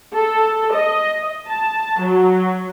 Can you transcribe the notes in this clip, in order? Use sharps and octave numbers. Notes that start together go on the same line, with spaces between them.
A4
D#5
A5
F#3